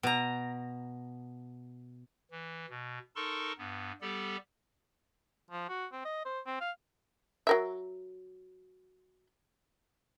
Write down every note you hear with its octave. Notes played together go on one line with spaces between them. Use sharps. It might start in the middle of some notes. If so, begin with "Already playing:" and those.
B2 A#5
E3
B2
D#4 A4 A#4 A5 C6 C#6
G2 B3
G3 B3 G4 A4 D5
F3
F#4
C4
D#5
C5
C4
F5
F#3 A#4 E5